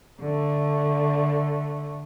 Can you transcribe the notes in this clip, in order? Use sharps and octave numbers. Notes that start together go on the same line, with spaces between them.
D3 A3